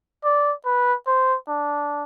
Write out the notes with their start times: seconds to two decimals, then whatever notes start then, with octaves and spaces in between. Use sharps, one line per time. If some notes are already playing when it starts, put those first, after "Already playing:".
0.24 D5
0.65 B4
1.07 C5
1.48 D4